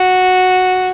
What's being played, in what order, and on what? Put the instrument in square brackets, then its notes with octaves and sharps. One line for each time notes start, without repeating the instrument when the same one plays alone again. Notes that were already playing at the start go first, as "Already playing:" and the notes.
Already playing: [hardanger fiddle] F#4